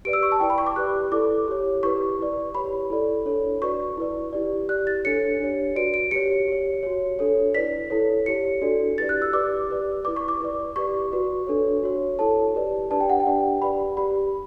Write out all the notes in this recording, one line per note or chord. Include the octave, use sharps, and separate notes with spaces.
G4 B4 D5 D7
E6
C#6
A5
E4 B4 D5 G5
B5
C#6
D6
G4 B4 D5 F#6
E4 A4 D5 D6
G4 C#5
E4 G4 B4 C#6
E4 B4 D5
G4 C#5 B5
E4 A4 D5
D4 A4 C#5
F#4 B4 D5 C#6
E4 B4 D5
E4 G4 D5
G4 D5 F#6
A6
D4 A4 C#5 C#7
D4 G4 C#5
F#4 B4 D5 D7
D7
G4 C#5 C#7
G4 C#5
F#4 C#5
D4 A4 C#5
E4 B4 D5 B6
E4 A4 C#5
E4 G4 C#5 C#7
D4 F#4 A4 D5
E4 G4 B4 D5 A6
F#6
E6
G4 B4 D5 D6
G4 B4 D5
E4 B4 D5 D6
C#6
D6
E4 B4 D5
G4 B4 D5 C#6
F#4 B4 D5
D4 A4 C#5
F#4 C#5
E4 A4 C#5 A5
G4 B4 D5
D4 G4 B4 D5 A5
G5
F#5
G5
D4 G4 D5
G4 B4 D5 B5
G4 D5 B5